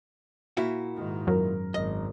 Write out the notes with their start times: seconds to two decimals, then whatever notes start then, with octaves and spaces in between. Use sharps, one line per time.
0.57 A#2 E4 F#4
0.94 G#2 D#3
1.27 F#2 A#4
1.74 G#1 D#5